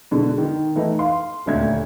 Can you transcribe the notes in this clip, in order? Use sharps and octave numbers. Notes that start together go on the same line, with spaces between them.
B2 D3 G#3
D#3
E3 A3 D#4 E4
F5 C6
D#1 D2 G#6